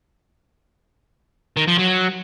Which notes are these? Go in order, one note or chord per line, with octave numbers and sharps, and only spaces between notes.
D#3
F3
F#3